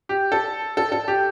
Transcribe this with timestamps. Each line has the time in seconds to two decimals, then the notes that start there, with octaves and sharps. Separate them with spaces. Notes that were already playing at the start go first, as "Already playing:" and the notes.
0.09 G4
0.32 A4
0.77 A4
0.92 A4
1.08 G4